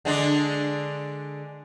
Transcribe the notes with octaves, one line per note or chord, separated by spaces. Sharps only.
D3 G#3 D4